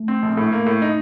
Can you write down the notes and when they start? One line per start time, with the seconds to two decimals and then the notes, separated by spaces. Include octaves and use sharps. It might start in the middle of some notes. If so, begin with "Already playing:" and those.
Already playing: A3
0.08 C4
0.22 A#1
0.37 A2
0.52 A#3
0.66 A2
0.82 D#4